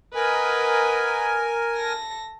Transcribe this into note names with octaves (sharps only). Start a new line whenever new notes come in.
A#4 B4 D#5 F#5 G#5
A4 A#6